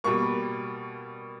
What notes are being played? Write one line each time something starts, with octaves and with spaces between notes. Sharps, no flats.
B2 G3 A#3 C#6